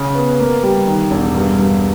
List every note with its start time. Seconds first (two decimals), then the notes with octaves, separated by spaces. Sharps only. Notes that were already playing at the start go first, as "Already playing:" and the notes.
Already playing: C#3
0.15 B3
0.39 A#3
0.63 G3
0.87 D#3
1.11 E1
1.35 G2
1.58 G2